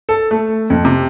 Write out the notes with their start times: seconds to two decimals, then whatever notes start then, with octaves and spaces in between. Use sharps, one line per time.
0.09 A4
0.31 A3
0.70 F2
0.85 C3